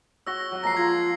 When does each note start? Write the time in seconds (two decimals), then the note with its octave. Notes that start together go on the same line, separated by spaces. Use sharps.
0.27 F#4 C#5 E6 A#6 G7
0.52 F#3 F#4
0.64 F3 A#3 F#5 A#5 A#6 C7
0.77 F4 G#6 A#6